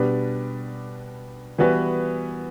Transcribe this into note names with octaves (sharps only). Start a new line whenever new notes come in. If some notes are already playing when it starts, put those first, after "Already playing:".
Already playing: B2 G3 D4 G4 B4
E3 G3 B3 F#4 B4